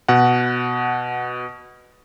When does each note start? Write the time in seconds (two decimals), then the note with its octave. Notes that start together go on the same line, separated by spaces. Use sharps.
0.08 B2 F#5